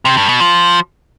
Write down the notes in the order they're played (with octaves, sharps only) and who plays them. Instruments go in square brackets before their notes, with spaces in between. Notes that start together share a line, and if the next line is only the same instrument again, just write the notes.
[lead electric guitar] C3
G2
B2
F3